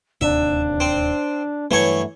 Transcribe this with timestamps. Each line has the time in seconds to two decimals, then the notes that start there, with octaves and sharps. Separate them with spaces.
0.21 D1 D#2 C3 D4 E5
0.80 C4
1.71 G2 E3 F#3 A3 C#5